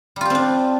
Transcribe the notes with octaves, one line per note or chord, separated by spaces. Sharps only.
G3 C4 D4 F4 G4